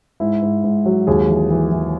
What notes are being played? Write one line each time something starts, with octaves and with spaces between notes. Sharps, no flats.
G#2 E4
G#2
G#2
F#3
D#2 G#4
E3
E3
E3